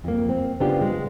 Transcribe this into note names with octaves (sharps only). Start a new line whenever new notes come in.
F2 A#3
C4
C#3 B3 D4 F4 G4
G#3